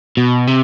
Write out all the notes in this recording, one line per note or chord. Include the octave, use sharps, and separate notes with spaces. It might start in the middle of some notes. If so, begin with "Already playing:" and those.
B2
C3